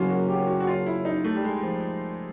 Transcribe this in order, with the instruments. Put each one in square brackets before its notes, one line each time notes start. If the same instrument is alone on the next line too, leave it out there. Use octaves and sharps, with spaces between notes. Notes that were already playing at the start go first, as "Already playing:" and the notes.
Already playing: [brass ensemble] F#1 F#2 C#3 F#3 [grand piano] A#3 B3 C#4 F4
[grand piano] F#4
G4
F#4
F#4
F4
E4
D#4
A3
G3
G#3
F3